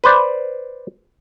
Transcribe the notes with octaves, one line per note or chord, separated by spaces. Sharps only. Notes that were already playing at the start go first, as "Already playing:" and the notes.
B4 C5 D5